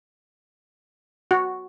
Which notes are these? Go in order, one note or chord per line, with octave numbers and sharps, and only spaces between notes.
F#4